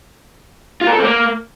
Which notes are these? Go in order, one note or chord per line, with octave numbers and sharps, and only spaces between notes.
F4
A#4
A4
C4
A#3